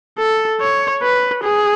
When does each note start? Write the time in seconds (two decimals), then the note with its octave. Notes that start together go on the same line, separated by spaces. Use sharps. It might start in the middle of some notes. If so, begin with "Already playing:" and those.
0.19 A4
0.61 C#5
1.02 B4
1.43 G#4